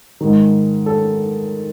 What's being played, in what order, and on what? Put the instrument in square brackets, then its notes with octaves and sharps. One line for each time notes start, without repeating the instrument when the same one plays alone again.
[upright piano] G#2 D#3
A4